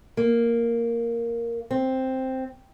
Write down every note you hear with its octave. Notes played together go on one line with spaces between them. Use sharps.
A#3
C4